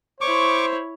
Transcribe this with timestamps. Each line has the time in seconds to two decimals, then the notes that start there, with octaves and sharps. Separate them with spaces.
0.21 E4 C5 C#5 C#6 D6